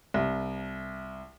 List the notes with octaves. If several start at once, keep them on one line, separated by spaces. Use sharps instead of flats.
C2